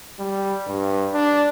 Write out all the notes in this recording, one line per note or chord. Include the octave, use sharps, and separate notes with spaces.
G3
G2
D4